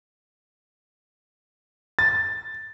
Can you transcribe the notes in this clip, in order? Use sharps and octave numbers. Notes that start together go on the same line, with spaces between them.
A6